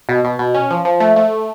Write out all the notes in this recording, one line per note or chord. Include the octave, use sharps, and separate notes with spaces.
B2
B2
B2
C#4
F3
F3
A3
A3